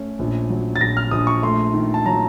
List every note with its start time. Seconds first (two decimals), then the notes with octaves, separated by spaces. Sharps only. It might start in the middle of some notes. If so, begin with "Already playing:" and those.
Already playing: A3 C#4
0.19 A#1
0.50 F#3
0.76 A6
0.81 A#1 A#6
0.97 F6
1.11 A#1 D#6
1.27 C#6
1.42 A3 C6
1.74 D#3
1.94 A5
2.06 F#3 A#5